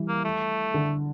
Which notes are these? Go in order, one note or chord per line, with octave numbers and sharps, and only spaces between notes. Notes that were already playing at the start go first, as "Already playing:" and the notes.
Already playing: E3 G3
A#3
A3
D3